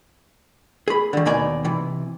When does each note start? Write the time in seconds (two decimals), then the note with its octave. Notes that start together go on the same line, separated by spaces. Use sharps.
0.88 G#4 B5
1.13 D3 D#3
1.25 D#2 B2 D#4 D5 G#5
1.65 C3 E3